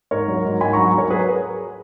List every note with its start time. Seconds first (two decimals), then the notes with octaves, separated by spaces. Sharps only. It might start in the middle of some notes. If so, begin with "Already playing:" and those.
0.11 G#2 A#4 C#5
0.28 F#3
0.45 G#2
0.61 G#2 G#5 B5
0.73 F#3 A#5 C#6
0.94 F#3 A#4 C#5
1.10 G#4 B4